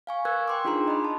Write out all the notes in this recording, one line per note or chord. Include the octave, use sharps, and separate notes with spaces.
F5 G#5 C#6
A#4 B4 E6 F#6 G#6
G5 C6 D6
D4 D#4 F4 G#4 A#5 C6
D#5 B5
A5